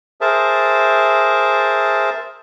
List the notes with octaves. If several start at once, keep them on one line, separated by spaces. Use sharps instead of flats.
G#4 A#4 C5 E5 A5